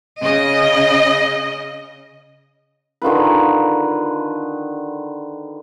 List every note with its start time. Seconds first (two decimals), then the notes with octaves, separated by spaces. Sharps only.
0.20 C#3 D#5
3.02 D3 D#3 F4 B4